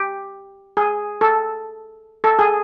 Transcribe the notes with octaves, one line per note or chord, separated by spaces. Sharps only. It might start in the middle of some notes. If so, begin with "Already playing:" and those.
Already playing: G4
G#4
A4
A4
G#4